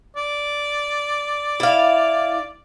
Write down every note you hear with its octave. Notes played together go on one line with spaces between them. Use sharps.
D5
E4 F5